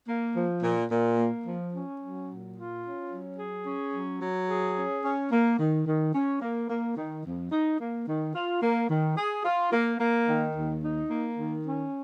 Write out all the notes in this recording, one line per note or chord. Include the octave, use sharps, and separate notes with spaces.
A#3
F3
A#2
A#2
A#3
F3
C#4
F#3
A#2
F4
C#4
F#3
G#4
C#4
F#3
F#3
G#4
C#4
C#4
A#3
D#3
D#3
C#4
A#3
A#3
D#3
F2
D#4
A#3
D#3
F4
A#3
D#3
G#4
F4
A#3
A#3
D#3
D#2
D#4
A#3
D#3
C#4